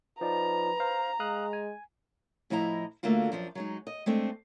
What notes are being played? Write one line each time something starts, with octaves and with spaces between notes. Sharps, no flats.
F3 D#4 B4 D5 A#5
C5 F5
G#3 F5 D#6 F#6
G#5
A2 F3 E4 D#5 A#5
D3 A3 A#3 D4 F4 F#4
F#2 F3 D4
F#3 G#3 D#4
D#5
G#3 A3 C4 D4 D#5